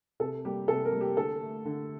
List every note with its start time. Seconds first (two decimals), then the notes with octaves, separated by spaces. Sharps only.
0.20 C3 A4
0.45 G3 A#3 G4
0.68 C3 A4
0.85 A#4
0.92 G3 A#3
1.01 G4
1.17 D3 A4
1.40 A3
1.65 D3